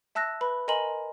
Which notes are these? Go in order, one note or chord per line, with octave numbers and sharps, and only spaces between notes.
E5 A5 E6 F#6 A#6
B4 B5
A#4 D#5 G#5 A#5 C6 F#7